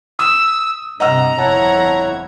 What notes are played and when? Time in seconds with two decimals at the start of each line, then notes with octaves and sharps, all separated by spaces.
0.19 D#6 E6
1.00 G2 C3 D#5 F#5 A#5 E6
1.38 G1 F2 E4 C#5 F#5 A5 G#6